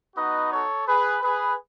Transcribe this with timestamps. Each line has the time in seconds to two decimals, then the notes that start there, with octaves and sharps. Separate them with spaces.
0.15 B3 D#4 F#4 B4 D#5
0.51 A4 C#5
0.87 G#4 B4
1.23 G#4 B4